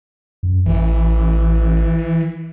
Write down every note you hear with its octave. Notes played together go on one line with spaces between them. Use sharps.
F#2
A1 E3